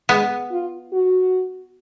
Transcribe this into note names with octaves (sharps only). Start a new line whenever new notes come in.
G#3 B3
F4
F#4